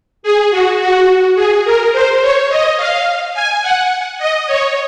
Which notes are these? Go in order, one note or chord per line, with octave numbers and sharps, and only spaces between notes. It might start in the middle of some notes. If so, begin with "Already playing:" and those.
G#4
F#4
F#4
G#4
A#4
C5
C#5
D#5
F5
G#5
F#5
D#5
C#5